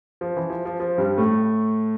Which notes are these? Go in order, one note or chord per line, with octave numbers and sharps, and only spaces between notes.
F3
E3
F3
F3
F3
G2 G3
A2 A3